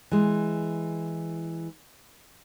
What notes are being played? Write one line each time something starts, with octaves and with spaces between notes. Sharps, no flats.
E3 G#3